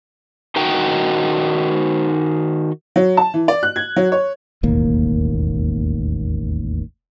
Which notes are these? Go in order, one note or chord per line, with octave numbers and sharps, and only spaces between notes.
D#3 D#4 F#4 G5
F#3
A5
E3
D5
F#6
G#6
F#3
C#5
E1 A1 D#2 A#3